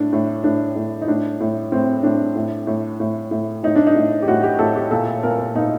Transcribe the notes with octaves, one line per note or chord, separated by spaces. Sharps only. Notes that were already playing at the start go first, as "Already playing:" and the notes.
Already playing: A2 D4
A2
A2 D4
A2
D#4
A2 D4
A2
A2 C4
A2 D4
A2
A2
A2
A2
A2 D#4
D4
D#4
A2
G4
A2 F#4
G4
A2 A4
G4
A#2 A4
A#2 A#4
A#4
A#2 D#4